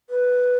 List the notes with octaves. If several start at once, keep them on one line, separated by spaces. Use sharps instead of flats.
B4